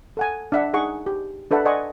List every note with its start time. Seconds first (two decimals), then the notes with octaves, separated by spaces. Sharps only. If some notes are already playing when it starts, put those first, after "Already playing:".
0.17 A4 F#5 G#5
0.52 D4 E5 F#5
0.73 D#4 G#4 F#5 C#6
1.06 G4
1.51 D4 A4 B4 E5 F#5
1.65 D5 D#5 F#5 G#5 C6 C#6